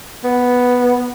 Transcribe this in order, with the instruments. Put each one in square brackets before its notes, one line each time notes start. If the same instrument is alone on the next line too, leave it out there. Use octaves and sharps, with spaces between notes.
[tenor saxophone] B3